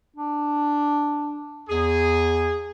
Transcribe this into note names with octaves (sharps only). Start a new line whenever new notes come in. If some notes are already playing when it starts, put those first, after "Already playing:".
D4
E2 G#4